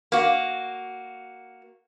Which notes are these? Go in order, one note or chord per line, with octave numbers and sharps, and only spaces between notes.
A#3 F#4